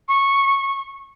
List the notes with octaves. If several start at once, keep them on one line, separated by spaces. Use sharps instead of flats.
C#6